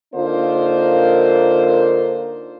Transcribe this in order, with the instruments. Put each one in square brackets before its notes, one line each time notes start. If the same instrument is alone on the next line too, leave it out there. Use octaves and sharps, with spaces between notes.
[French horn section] D3 A#3 D#4 F4 A#4 C5